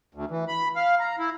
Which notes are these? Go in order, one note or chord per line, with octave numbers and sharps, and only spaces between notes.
D2
E3
B5
F5
A#5
E4